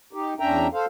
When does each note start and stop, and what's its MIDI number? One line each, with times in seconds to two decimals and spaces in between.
0.13 0.34 63
0.13 0.34 67
0.40 0.67 40
0.40 0.67 61
0.40 0.67 62
0.40 0.67 76
0.40 0.67 79
0.40 0.67 82
0.73 0.86 69
0.73 0.86 72
0.73 0.86 77